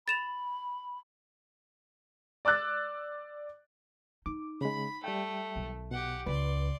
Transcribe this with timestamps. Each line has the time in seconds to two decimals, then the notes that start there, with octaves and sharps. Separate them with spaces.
0.08 B5 A6 E7 F7
2.45 D5 D6 E6 F#6 A6
4.26 D#4 D6
4.61 C#3 G#3 B5
5.04 G3 A3 E5 G5
5.56 B1 D#3
5.91 B2 G4 F#5
6.26 C#2 B4 D5 C6